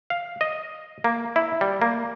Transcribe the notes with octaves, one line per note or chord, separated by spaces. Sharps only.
F5
D#5
A#3
E4
G3
A#3